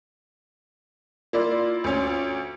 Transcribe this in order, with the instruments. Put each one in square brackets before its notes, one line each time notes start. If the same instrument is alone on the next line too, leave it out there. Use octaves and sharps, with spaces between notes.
[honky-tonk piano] A#3 E4 D5 [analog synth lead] F4
[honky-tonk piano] D2 C#4